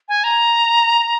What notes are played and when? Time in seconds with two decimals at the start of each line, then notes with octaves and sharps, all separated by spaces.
0.08 G#5
0.24 A#5